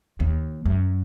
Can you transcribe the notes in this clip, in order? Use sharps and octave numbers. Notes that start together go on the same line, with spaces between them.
D#2
F#2